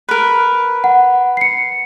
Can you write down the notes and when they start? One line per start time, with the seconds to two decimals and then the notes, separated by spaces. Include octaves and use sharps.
0.09 A#4 B4
0.84 F#5
1.37 C7 C#7